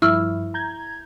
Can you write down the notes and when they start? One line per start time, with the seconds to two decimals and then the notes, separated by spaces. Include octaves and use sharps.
0.02 G2 F3 E4 C#6 E6 F6
0.54 A#5 G6 G#6